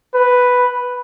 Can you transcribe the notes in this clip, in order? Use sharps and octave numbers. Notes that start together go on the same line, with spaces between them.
B4